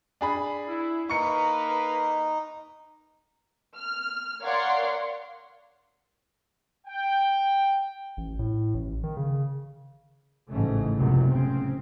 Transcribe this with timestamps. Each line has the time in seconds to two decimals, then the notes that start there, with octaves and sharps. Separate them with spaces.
0.21 D4 G#4 B5
0.68 E4
1.10 A#3 D#4 B4 C#6 C#7
3.75 F6
4.42 A#4 C#5 D5 F5 F#5 C6
6.87 G5
8.17 A1
8.39 A2
8.74 A1
9.04 D#3
9.17 C#3
10.50 A1 G#2 C#3 A3
10.97 F1 C#2 F#2 A2 C3 B3
11.28 C#3 C4